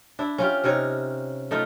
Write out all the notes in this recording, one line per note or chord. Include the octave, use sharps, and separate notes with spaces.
D4 E4
C#4 F4 G4
C3 C#4 D#4 C#5
A3 D#4 F4